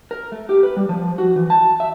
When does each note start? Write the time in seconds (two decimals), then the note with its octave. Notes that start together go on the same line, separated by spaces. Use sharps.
0.11 A#4
0.32 A3
0.49 G4
0.63 B4
0.77 G3
0.89 F3
1.18 F#4
1.36 E3
1.50 A5
1.80 E5